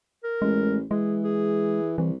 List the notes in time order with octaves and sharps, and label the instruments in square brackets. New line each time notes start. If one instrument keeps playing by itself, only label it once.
[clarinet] A#4
[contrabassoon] A1 [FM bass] G#3
[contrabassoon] E3 [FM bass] G#3 [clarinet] G#4
[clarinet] G#4
[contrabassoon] C2 [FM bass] E3